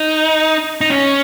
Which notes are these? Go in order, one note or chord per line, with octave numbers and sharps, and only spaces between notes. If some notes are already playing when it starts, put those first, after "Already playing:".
Already playing: D#4
D#4
C#4